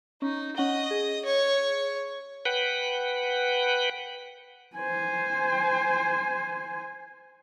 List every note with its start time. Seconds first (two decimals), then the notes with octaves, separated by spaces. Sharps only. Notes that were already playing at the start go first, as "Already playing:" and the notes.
0.22 C#4 D#4
0.57 C#4 D#5 F#5 G7
0.91 G#4
1.25 C#5
2.45 B4 F#5 G5
4.76 C5 G#5